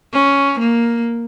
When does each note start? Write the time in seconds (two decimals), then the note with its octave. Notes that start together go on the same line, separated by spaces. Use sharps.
0.12 C#4
0.59 A#3